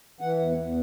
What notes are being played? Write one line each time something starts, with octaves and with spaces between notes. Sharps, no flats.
E3 F#5
E2
E2